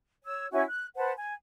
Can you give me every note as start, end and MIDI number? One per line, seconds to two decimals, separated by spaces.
0.24 0.46 73
0.24 0.46 88
0.52 0.62 61
0.52 0.62 64
0.52 0.62 66
0.52 0.62 80
0.68 0.86 90
0.96 1.12 71
0.96 1.12 72
0.96 1.12 78
0.96 1.12 81
1.17 1.33 80